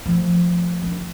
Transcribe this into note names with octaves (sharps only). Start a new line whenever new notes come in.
F3 A3
D#3 D4